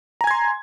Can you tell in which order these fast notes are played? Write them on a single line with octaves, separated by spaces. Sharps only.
A#5 G#5 G#6 C6